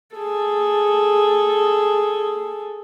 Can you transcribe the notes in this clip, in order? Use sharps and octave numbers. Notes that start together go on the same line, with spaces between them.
G#4 A4